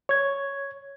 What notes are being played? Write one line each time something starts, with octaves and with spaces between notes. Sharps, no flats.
C#5 G#6